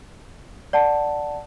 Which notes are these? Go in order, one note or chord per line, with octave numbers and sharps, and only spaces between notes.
D5 F#5 A5